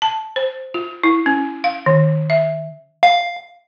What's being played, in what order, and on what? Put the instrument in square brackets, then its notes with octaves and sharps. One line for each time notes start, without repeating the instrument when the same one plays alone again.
[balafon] A5
C5
F4
E4
C#4
F5
D#3
E5
[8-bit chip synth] F5